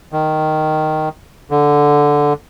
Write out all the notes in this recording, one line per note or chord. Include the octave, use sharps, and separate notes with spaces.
D#3
D3